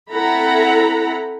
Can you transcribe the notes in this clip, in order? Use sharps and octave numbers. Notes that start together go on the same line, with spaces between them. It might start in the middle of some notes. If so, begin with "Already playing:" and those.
C4 E4 A4 F#5 A#5 B5